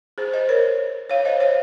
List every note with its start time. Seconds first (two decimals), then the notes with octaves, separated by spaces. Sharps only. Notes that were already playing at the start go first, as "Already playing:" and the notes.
0.18 G#4 C5
0.33 C5 D#5
0.49 A#4 C#5
1.09 C#5 F5
1.25 C5 D#5
1.40 C#5 F5